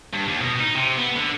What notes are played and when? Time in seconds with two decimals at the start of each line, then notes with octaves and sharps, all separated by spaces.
0.13 G2
0.28 D#2
0.41 B2
0.61 D#4
0.76 C3
0.99 B3
1.17 D3